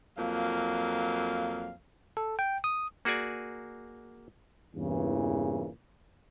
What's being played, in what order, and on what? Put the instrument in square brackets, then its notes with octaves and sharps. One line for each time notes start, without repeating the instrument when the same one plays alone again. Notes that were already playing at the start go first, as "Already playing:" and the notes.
[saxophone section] F2 F#3 A#3 F5
[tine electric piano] A4
G5
D#6
[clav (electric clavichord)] A#3 F#4 G#4 D5 G#5
[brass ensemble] E2 G2 A#2 C#3 E3